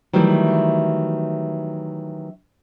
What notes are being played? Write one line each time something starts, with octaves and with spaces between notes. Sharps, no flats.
D#3 E3 F#3 G3 A3 E4